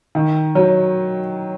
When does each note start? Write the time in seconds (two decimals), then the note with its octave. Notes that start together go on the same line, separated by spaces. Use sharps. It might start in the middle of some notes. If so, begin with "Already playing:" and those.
0.15 D#3
0.55 F#3